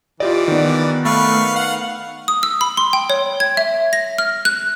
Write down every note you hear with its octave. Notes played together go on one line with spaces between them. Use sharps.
E3 F4 G4 D5 D#5
D#3 B3
A3 B4 F5 C#6
F5 F#5
D#6
E6
B5
C6
G5
C#5
G#6
E5
A#6
F6
F#6